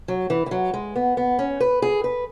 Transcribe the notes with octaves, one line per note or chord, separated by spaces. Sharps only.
F#3
E3
E3
F#3
G#3
B3
B3
C#4
B4
G#4
B4